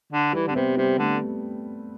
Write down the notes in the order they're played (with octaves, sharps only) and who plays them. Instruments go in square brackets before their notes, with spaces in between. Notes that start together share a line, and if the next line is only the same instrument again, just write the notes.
[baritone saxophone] D3
[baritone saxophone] E3 [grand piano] G3
[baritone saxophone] D3
[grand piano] C4
[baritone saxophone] C3 [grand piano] B3
[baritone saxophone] C3 [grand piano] G3
[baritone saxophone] D3 [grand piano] A3